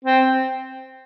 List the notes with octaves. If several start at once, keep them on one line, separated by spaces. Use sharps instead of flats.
C4